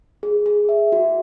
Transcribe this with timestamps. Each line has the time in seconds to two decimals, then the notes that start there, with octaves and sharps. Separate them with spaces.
0.23 G#4
0.46 G#4
0.69 E5
0.92 F#4